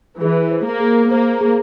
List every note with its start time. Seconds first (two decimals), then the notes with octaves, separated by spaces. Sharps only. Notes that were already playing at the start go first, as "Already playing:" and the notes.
0.20 E3 G#4
0.51 C5
0.66 A#3
0.80 G#4
1.11 A#3 C5
1.41 G#4